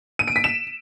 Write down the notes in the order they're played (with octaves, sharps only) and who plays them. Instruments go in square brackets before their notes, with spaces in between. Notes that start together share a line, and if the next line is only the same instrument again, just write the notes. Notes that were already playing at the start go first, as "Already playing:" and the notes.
[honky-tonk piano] D#7
D7
B6
E7